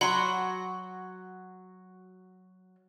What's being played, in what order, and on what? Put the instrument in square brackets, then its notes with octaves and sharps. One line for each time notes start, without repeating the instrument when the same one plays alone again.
[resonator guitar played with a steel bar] F#3 F#4 [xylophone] F#5 B5 C6